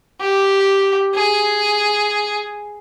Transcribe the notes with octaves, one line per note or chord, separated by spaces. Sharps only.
G4
G#4